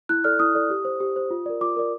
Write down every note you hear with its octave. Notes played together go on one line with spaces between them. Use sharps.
E4 F#6
A4 D5 F6
E4 D#6
A4 D5
G4
C5
G4
C5
F4
A#4 D5
F4 D6
A#4 D5